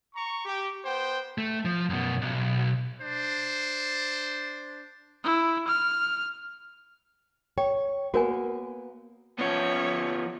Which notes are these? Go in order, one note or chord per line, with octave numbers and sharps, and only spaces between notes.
A#5 C#6
G4
B3 C5 G5
A3
F3
F#2 B2
B1
D4 C5
E4
F6
C#5 G5
A#3 B3 F#4 A#4 G#5
F3 B3 C#4 C#5